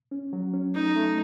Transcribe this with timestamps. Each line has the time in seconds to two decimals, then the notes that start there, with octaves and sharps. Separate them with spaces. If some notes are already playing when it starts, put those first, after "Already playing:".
0.11 C#4
0.33 F#3
0.54 C#4
0.75 A3 D#4
0.96 A3